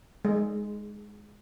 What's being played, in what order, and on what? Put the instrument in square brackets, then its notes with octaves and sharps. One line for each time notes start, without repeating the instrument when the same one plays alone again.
[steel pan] G#3